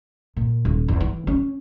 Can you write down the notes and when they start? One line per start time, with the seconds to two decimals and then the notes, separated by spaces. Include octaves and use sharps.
0.37 A#2
0.65 D#1
0.88 E2
1.00 E3
1.27 C#4